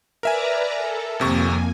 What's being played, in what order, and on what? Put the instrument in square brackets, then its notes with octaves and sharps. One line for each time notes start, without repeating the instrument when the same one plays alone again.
[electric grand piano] A#4 E5 G#5 [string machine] B4 D5 A#5
[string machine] A4
[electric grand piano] G#1 C3 C#6 [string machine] F2 A#3 G#5